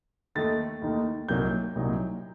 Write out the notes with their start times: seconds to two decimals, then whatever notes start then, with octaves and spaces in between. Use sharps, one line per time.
0.35 D#2 D#3 A3 D#4 A6
0.82 D#2 D#3 A3 D#4
1.29 C2 A#2 F#3 A#3 D#4 G6
1.75 C2 A#2 F#3 A#3 D#4